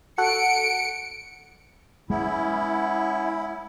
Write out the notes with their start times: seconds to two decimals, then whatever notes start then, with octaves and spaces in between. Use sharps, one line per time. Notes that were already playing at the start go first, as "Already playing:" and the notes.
0.18 F#4 A4 F#5 C#7 D7
2.10 G#3 B3 C#4 E4